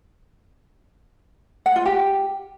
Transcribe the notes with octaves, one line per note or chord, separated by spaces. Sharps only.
F#5
F4
G4